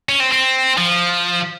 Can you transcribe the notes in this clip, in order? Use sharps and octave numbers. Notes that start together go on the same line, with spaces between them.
C#4
C4
C4
F3